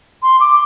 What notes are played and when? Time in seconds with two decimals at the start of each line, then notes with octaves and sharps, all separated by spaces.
0.23 C6
0.40 D6